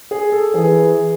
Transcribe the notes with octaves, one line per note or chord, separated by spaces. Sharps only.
G#4
A4
E3 G#4